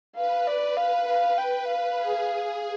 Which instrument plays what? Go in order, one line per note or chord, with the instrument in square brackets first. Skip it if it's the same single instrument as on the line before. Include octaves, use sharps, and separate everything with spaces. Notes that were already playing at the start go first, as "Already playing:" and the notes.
[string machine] B4 [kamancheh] F5
[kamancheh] D5
[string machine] B4 [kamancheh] F5
[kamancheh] F5
G5
F5
[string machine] G#4